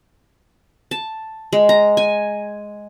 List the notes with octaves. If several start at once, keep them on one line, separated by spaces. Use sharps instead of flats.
A5
G#3
A#5
G#5